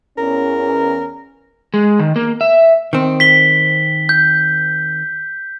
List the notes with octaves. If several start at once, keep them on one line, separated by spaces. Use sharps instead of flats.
E2 C#4 A#4
G#3
D#3
A#3
E5
D#3 C4
B6 G7
G6